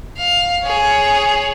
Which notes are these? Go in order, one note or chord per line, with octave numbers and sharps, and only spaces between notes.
F5
G#4 C#5